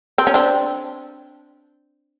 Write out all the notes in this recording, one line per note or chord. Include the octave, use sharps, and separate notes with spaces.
C4
C#4
C4 D4